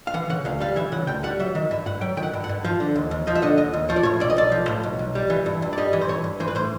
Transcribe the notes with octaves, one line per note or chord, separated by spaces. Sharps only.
F5
E3 F#5
C#3 F#5
D2 F5
G3 F5
E3 E5
C#3 F#5
D2 G5
G3 F#5
F#3 E5
D#3 E5
G2 E5
G2 F#5
F#3 G5
D#3 G5
F#5
G2
F#5
G2
F3 F5
D3
D#2
D#2
F3 D#5
E5
D3 D#5
D#2 D#5
D#2
F3 C#5
D5
A2 C#5
B1 D5
D#5
B1 D5
F3
A2
B1
B1
G3
E3
G2
G2
D5
G3 D#5
E3
C5
G2 C#5
G2
E3 C5
B4
A2 C5